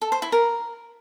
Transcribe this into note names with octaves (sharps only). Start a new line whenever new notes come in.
A4
C5
E4
A#4